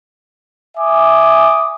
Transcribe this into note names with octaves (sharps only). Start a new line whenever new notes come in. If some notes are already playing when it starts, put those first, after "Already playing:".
E5 G#5 D6 D#6